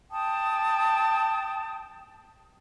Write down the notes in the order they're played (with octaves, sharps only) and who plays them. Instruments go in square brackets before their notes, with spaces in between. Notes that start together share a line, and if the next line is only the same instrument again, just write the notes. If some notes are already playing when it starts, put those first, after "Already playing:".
[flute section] G5 A5 D#6